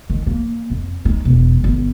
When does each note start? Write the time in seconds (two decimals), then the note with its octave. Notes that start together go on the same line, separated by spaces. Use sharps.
0.10 D#3
0.27 A#3
0.70 F2
1.05 D#4
1.25 E1
1.64 G1